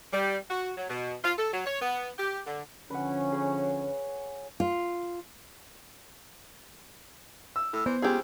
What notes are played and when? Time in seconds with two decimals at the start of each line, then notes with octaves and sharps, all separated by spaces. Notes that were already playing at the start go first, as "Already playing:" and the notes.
0.12 G3
0.49 F#4
0.77 F#3
0.89 B2
1.24 F4
1.38 A4
1.52 F#3
1.66 C#5
1.81 B3
2.18 G4
2.46 D3
2.90 D3 F3 C#4 B4 F#5
3.32 G#4 C#5
4.60 F4
7.56 E6
7.73 A2
7.86 E3 B3 C5
8.02 C#2 G4 G#4